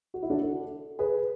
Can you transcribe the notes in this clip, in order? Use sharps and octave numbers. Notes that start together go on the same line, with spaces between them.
F#4
E4
D4 F#4
F#4 A4
G#4 B4